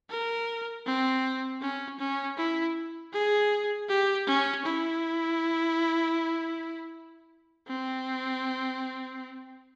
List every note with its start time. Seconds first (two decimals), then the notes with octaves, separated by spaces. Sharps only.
0.10 A#4
0.86 C4
1.62 C#4
1.99 C#4
2.37 E4
3.13 G#4
3.89 G4
4.27 C#4
4.66 E4
7.68 C4